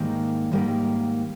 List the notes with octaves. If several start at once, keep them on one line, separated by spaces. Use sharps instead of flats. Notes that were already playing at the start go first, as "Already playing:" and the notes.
Already playing: G#2 D#3 G3 A#3
G#2 D#3 G3 A#3